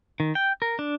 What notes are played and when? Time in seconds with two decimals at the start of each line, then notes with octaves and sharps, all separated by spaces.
0.20 D#3
0.35 G5
0.62 A#4
0.79 D4